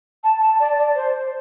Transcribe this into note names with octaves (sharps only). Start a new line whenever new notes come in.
A5
A5
D5
D5
C5